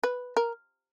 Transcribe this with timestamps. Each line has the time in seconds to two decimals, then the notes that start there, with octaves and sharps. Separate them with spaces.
0.03 B4
0.37 A#4